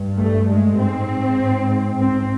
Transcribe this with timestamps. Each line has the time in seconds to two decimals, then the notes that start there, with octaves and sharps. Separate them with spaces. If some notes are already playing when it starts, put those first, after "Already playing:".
Already playing: G2
0.18 A3
0.49 G#3
0.78 G#2 C4
1.99 G#2 C4